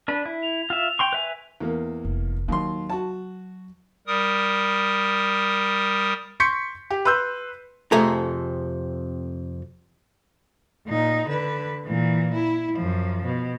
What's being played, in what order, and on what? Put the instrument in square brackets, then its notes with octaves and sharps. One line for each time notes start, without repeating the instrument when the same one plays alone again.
[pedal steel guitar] D4 B4
E4
[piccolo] F7
[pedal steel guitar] F4 E5
G5 C6 C#6
B4 E5 G#5
[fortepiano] E2 A#3
[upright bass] F1
[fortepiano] D#2 C6 [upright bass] F#3
[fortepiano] F#4 A5
[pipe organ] G3 A#4 D#6
[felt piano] C6 C#6 G6 B6 C#7
G4
B4 C6 E6 G6
[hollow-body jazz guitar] F2 C3 A3 G#4 A#5
[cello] A#2 D#4
D3 B4
A#2 E3
E4
F#2 F3
B2